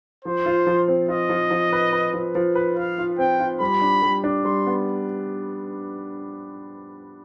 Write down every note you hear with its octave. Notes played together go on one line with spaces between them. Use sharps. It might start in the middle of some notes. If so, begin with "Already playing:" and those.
F3 C5
F4
F3
C4
F4 D#5
F3
F3
B4
B4
F3
F3
B4
B4 F5
F4
C4 G5
F4
G3 B5
D4
G3
D4
G3 C6
B3